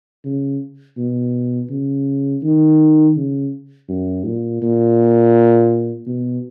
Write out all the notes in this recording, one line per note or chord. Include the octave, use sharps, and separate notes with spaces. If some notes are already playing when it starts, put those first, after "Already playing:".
C#3
B2
C#3
D#3
C#3
F#2
A#2
A#2
B2